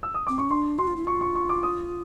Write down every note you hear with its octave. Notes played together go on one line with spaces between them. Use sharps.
E6
D#6
C4 D6
C#4 C#6
D4 C6
F#4 C6
F4
E4
F4 C#6
C#6
C#6
D6
D#6